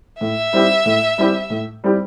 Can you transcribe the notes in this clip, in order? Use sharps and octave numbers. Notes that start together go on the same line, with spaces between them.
A2 E5
G3 C4 E4 G4
A2
G3 C4 E4 G4
A2
G3 C4 E4 G4